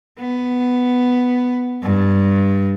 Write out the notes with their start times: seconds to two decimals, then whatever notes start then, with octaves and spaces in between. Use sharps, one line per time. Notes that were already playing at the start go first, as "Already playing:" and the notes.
0.19 B3
1.82 G2